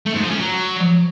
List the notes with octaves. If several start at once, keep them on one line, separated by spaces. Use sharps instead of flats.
A3
G#2
F3
C#4
F#3